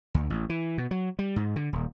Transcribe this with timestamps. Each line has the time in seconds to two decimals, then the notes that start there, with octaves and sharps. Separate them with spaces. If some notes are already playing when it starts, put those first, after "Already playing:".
0.14 D2
0.30 A1
0.50 E3
0.78 B2
0.91 F#3
1.19 G3
1.36 G#2
1.56 D3
1.73 D#1